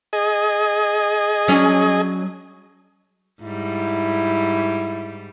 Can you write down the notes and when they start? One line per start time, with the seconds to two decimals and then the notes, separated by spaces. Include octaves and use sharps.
0.13 G#4 D#5
1.48 F#3 C#4 D4
3.42 G#2 G3 E4